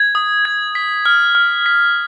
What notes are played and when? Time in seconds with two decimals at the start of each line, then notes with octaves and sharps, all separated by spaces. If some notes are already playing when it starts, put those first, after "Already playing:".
Already playing: G#6
0.15 D#6
0.45 G#6
0.75 B6
1.06 F6
1.35 F6
1.66 B6